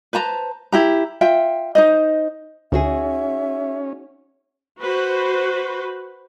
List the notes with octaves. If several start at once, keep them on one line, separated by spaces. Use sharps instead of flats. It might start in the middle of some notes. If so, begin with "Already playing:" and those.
B4 C5 A5 A#5
E4 G4 A#5
F4 E5 G5
D#4 C5 D#5
D2 C#4 D#4 F#4 G#4 E5
F#4 B4 C5